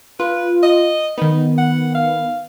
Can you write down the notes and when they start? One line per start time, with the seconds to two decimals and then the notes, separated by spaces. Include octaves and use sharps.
0.20 F4 B4
0.63 D#5
1.18 D#3 B3 D#4
1.58 F#5
1.95 F5